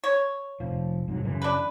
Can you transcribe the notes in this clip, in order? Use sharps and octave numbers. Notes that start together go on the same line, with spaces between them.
C#5
F1 F3
G#2 C3 F#3
F#2 C#3 E3
D4 B4